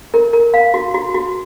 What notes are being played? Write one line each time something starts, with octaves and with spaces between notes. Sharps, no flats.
A#4
A#4
F5
F#4
F#4
F#4